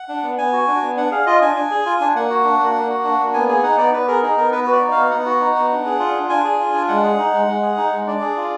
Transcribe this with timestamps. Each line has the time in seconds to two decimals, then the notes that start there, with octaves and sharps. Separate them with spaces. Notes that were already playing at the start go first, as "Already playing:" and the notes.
Already playing: F#5
0.09 D4
0.23 B3
0.38 B3 G#5
0.53 F#4
0.67 D4
0.82 B3
0.97 D4 F#5
1.11 G#4 F5
1.26 F4 D#5
1.41 D4 G#5
1.56 D4
1.71 G#4
1.85 F4
2.01 D4
2.15 A#3 F#5
2.30 F#4
2.45 D4
2.60 A#3
2.75 A#3
2.90 F#4
3.04 D4
3.19 A#3
3.33 B3 G#5
3.49 G#4 G#5
3.63 D#4 F#5
3.77 B3 D5
3.93 B3 B4
4.08 G#4 A#4
4.22 D#4 G#4
4.37 B3 A#4
4.51 B3 B4
4.64 F#4 B4
4.72 D5
4.81 D#4
4.92 F5
4.97 B3
5.11 B3 F#5
5.26 F#4
5.41 D#4
5.56 B3
5.70 D4
5.86 G#4
5.99 F4
6.15 D4
6.29 D4 G#5
6.44 G#4
6.60 F4
6.74 D4
6.88 G#3 F#5
7.03 G#4
7.18 D#4
7.33 G#3
7.48 G#3
7.62 G#4
7.77 D#4
7.93 G#3
8.07 D4 D5
8.21 G#4
8.37 F4